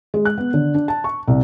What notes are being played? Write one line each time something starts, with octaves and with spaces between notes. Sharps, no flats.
G#3
F#6
B3
D3
D4
A5
C#6
C2